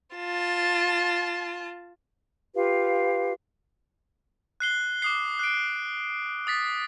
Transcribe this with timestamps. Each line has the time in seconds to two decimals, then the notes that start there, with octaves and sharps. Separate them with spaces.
0.16 F4 A5
2.54 F4 G4 B4 F5
4.60 F#6 C7 G7
5.02 D6 D#6 C7
5.39 F#6 D7
6.47 D#6 A6 B6